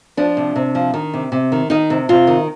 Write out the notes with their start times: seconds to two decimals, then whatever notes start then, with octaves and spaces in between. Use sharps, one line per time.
0.17 F3 D4
0.37 C3
0.56 C3
0.75 F3
0.94 D#3
1.14 C3
1.32 C3
1.52 D#3
1.70 D#3 D#4
1.90 C3
2.09 C3 F4
2.27 D#3